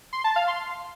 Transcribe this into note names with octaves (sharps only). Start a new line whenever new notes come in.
C6
A5
F5
C6